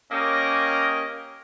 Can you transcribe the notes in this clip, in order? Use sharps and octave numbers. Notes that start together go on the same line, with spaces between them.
A#3 C#4 G4 A#4 D#5